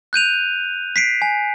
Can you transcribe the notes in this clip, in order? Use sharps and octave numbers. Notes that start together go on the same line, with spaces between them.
F#6 G6 D#7 F7
B6 C7 D7
G#5